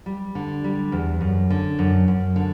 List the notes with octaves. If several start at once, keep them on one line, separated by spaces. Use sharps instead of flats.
G3
D3
G3
E2
F#2
D3
F#2
F#2
D3